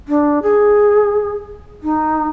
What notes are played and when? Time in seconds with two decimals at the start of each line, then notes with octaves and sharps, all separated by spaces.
0.08 D4
0.43 G#4
1.83 D#4